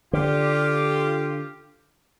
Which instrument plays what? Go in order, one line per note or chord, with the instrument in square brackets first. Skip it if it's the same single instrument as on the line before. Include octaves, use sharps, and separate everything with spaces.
[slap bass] D3 [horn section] F4 G4